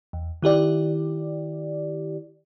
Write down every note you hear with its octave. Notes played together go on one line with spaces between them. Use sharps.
E2
D#3 E4 G4 D5